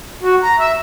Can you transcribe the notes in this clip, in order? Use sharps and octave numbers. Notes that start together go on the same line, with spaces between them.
F#4
A#5
E5